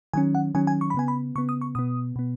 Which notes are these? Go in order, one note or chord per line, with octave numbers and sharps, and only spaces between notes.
D#3 F#3 C#4 G#5
F#5
D#3 F#3 C#4 G#5
G#5
C#6
B5
C#3 B3 G#5
B5
C#3 B3 C#6
D#6
C#6
B2 B3 D#6
B2 B3